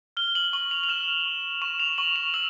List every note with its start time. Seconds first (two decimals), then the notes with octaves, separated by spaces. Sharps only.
0.17 F6 G7
0.35 F#7
0.53 C#6 F#7
0.71 F7
0.83 F7
0.89 F6 E7
1.26 C#6
1.62 C#6 E7
1.80 F7
1.98 C#6 F#7
2.16 F7
2.34 E6 F#7